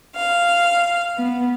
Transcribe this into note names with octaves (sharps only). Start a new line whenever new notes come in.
F5
B3